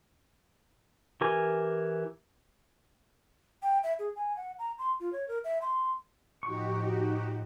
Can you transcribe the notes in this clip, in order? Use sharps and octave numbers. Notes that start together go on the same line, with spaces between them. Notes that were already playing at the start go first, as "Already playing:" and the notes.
E3 G4 A#4 G#5
G5
E5
G#4
G#5
F#5
A#5
C6
F4
C#5
A#4
E5
C6
A2 F3 D#4 F#4 G4 C#6